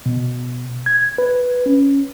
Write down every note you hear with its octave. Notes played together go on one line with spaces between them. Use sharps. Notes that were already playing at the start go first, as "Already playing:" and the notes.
B2
G#6
B4
C#4